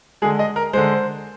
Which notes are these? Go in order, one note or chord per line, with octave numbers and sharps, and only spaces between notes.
D3 G#3 G#4
D#5
A#4
D3 G#3 C5